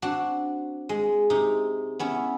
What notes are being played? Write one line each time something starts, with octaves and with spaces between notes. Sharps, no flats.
C4 D4 F#4
G#3
C3 D#4
B3 C#4 E4